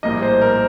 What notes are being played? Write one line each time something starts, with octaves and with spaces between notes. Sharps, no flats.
A#1 A2 G3 A#3 D#5
C5
A#4